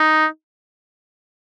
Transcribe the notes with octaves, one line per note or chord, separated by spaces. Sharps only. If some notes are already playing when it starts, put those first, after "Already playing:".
Already playing: D#4